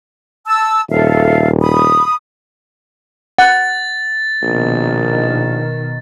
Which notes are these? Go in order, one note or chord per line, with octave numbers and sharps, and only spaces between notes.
A5 E6
D#1 A4 E5 F5
B5 D#6
F#5 A6
A#1 B2 D#3